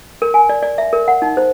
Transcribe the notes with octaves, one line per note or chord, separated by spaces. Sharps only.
A#4
G#5
D5
D5
E5
A#4
F#5
D#4
C5